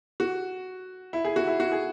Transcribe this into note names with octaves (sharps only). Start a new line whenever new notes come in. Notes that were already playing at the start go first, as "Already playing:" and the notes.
F#4
E4
G#4
F#4
E4
F#4
G#4